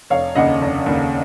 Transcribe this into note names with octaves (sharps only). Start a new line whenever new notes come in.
F1 C#5 F5
D#2 C#3 D#5 F#5
F1
D#2 C#3